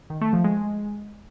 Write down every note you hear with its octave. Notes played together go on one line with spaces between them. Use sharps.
D#3
A3
F3
G#3